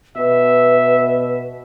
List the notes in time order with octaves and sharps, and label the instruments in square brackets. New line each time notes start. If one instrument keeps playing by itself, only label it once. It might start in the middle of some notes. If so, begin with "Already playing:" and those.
[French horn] B2 [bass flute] B4 [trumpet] E5